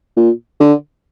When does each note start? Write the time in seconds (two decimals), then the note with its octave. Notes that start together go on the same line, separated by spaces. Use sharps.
0.17 A#2
0.60 D3